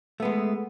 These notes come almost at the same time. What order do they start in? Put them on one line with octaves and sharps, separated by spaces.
A3 B3 G#3